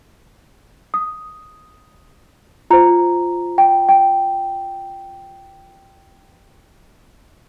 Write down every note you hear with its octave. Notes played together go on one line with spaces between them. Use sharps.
D#6
F4 C5 A#5
G5
G5